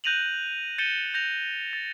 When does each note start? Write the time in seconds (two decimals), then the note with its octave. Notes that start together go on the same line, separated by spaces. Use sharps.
0.04 F#6 G6 A#6 D#7 F7 F#7
0.78 G6 A6 C#7 D#7 E7 G7
1.14 G6 A#6 F7
1.73 A6